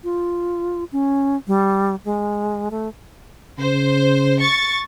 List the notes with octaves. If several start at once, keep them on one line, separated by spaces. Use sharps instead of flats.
F4
C#4
G3
G#3
A3
C#3 C5
C#6 A6